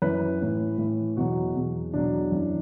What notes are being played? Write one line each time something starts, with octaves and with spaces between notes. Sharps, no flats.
F#2 E3 B4
A2 E3
A2 E3
E2 B2 F#3 F#4
E2 B2 F#3
E2 B2 F#3 D4
F#2 E3